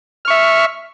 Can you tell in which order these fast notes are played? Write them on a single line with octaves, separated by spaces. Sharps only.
F6 C#6 E5